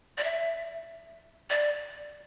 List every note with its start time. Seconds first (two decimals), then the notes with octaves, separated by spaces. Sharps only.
0.18 D5
0.24 E5
1.50 D5